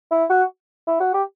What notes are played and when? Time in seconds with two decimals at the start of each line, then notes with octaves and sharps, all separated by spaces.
0.11 E4
0.30 F#4
0.87 E4
1.00 F#4
1.13 G4